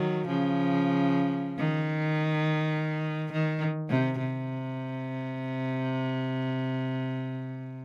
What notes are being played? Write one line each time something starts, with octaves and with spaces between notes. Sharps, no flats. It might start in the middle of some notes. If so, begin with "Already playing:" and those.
Already playing: D#3 F#3
C#3 F3
D#3
D#3
C3
C3